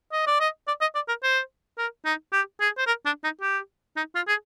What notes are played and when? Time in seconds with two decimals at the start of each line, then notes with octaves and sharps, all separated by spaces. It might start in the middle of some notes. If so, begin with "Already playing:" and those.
0.13 D#5
0.27 D5
0.40 D#5
0.68 D5
0.81 D#5
0.95 D5
1.08 A#4
1.23 C5
1.78 A#4
2.05 D#4
2.33 G4
2.61 G#4
2.78 C5
2.87 A#4
3.06 D4
3.24 D#4
3.42 G4
3.97 D#4
4.15 F4
4.28 G#4